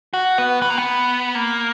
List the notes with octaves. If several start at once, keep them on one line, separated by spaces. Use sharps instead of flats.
F#4
B3
B3
A#3
B3
A#3